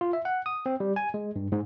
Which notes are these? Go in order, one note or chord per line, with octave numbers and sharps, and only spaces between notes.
F4
E5
F#5
D#6
C4
G3
G#5
G#3
G2
G#2